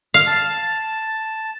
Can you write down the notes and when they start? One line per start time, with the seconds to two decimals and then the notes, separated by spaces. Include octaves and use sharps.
0.14 F5
0.27 A5